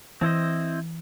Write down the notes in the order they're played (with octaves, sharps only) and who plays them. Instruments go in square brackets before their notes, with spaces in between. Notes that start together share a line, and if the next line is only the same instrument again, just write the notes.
[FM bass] E3 [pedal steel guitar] C4 E4 C5 D#5